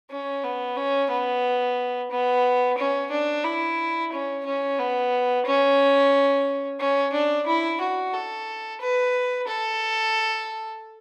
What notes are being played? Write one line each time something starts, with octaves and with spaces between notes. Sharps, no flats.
C#4
B3
C#4
B3
B3
C#4
D4
E4
C#4
C#4
B3
C#4
C#4
D4
E4
F#4
A4
B4
A4